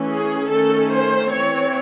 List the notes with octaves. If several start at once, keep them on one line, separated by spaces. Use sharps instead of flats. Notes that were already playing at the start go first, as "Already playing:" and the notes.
Already playing: E3 A3 C#4
G#4
D#3 A3 C#4 A4
C5
E3 C4 C#5